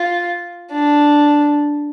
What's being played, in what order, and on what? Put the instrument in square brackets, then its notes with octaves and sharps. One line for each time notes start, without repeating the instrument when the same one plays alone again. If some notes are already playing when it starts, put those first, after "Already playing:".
Already playing: [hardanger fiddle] F4
D4